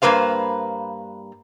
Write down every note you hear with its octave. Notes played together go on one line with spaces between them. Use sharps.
G2 F3 A#3 B4 C5 F5